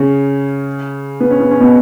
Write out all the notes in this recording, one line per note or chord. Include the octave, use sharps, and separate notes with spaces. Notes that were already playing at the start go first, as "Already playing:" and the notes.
Already playing: C#3 C#4
B3
C#4
B3
C#4
B2 B3